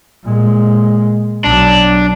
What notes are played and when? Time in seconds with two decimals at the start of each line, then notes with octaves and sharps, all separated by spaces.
0.24 A#2 G#3
1.44 B1 F#3 D4